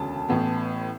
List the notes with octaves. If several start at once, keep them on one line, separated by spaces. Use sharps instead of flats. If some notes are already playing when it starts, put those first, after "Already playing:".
Already playing: E1 D2 C#3 A5
A1 A2 E3 B3